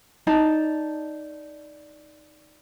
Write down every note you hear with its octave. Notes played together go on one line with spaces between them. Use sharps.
D#4 D5 A5